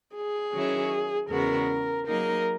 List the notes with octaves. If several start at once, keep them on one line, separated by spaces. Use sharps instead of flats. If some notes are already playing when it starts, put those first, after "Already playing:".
G#4
D#3 F#3 C#4 E4
E2 C#3 G#3 B3 F#4 A#4
F#3 A#3 D#4 G#4 A#4 D#5